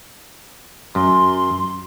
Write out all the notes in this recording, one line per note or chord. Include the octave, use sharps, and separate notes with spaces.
F#2 C6